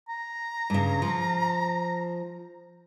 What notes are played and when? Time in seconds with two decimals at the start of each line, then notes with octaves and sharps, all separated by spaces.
0.09 A#5
0.70 G2 C#3
1.02 F3